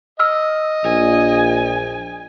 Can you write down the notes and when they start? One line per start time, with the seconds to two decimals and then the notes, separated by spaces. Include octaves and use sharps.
0.19 D#5 E6 F6
0.85 A#1 G#5